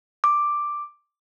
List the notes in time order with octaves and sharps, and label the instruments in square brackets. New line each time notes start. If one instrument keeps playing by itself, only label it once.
[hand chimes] D6